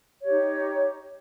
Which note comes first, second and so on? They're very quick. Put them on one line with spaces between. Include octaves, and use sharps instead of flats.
C#5 G4 D#4